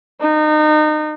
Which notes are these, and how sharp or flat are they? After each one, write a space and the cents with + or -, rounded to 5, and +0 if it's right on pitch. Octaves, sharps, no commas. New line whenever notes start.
D#4 -30